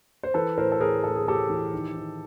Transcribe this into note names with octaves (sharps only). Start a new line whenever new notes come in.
C5
E3 A4 B4
A2 A#4 C5
A4
A2 G#4 A#4
A2 A4
G#4
A2 G4 A4
E3
D#3
D#3